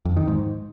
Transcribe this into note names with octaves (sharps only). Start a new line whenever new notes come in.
F2
D#3
G#2